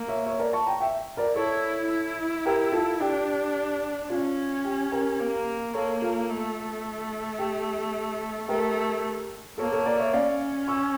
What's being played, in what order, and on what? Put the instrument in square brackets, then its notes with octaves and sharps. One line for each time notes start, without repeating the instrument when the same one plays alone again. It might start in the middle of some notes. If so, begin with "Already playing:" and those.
Already playing: [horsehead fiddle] A#3
[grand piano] C#5 E5
C#5 E5
A#4 D5
A5 C#6
G5 A#5
E5 G5
A#4 D5
[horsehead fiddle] E4 [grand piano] A4 C#5
[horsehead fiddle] E4
[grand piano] G4 A#4
F4 A4
[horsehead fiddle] D4 [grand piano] G4
[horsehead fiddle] C#4 [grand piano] F4
[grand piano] G4
G4 A#4
[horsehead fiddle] A#3
[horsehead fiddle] A#3 [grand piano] A4 C#5
[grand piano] F4 A4
[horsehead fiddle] A3
[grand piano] G4
[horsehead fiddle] A3 [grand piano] G4 A#4
[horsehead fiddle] A#3 [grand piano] A4 C#5
[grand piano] A4 C#5
A#4 D5
C#5 E5
[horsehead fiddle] C#4 [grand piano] D5 F5
[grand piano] C#6 E6